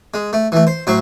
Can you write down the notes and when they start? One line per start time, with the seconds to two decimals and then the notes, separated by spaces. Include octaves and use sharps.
0.14 G#3
0.33 A3
0.52 E3 A3
0.67 C5
0.87 A2 F#3 C5 C#6